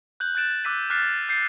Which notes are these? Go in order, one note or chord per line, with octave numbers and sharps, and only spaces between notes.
F#6 G6 F#7
F#6 G6 A6 D7 E7
D6 E6 F#6 B6 D#7 F#7
D6 F6 F#6 A6 B6 C7
G6 A6 C7 C#7